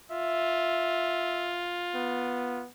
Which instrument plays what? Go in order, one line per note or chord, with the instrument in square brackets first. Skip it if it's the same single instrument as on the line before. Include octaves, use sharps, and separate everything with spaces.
[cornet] F4 [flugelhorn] E5
[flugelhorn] B3